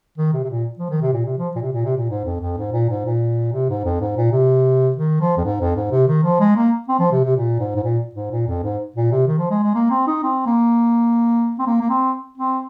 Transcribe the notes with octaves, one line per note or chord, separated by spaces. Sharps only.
D#3
C3
C3
A#2
F3
D#3
C3
A#2
C3
F3
A#2
C3
A#2
C3
A#2
G#2
F2
F2
G#2
A#2
G#2
A#2
C3
G#2
F2
G#2
A#2
C3
D#3
F3
F2
G#2
F2
G#2
C3
D#3
F3
G#3
A#3
C4
F3
C3
C3
A#2
G#2
G#2
A#2
G#2
A#2
F2
G#2
A#2
C3
D#3
F3
G#3
G#3
A#3
C4
D#4
C4
A#3
C4
A#3
A#3
C4
C4